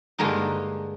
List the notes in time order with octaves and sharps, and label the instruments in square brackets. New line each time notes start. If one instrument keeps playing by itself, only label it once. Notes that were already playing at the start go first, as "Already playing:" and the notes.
[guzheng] G2 D3 G#3 A#3 D#4